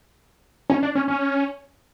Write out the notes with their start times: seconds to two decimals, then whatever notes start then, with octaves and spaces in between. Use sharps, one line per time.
0.70 C#4
0.83 D4
0.95 C#4
1.08 C#4